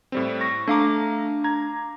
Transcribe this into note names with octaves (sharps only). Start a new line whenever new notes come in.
A2 G3 C4
C#6 A#6
A3 D4 F5 A#5 D6
A#5 G#6